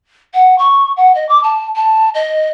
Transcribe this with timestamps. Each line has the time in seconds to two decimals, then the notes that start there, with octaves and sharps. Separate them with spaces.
0.34 F#5
0.58 C#6
0.97 F#5
1.15 D#5
1.29 D6
1.43 A5
1.76 A5
2.14 D#5